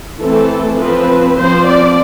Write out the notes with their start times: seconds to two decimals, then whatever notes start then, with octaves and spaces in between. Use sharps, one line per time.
0.21 E3 A3 C4 A4
0.79 F3 C4 B4
1.38 F3 C4 C5
1.67 D5